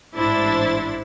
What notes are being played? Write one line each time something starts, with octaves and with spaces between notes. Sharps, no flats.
A1 G#2 D4 E4 C5 A6